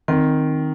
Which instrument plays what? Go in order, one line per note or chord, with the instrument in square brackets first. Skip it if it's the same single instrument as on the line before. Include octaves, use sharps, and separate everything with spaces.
[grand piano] D#3 [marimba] C4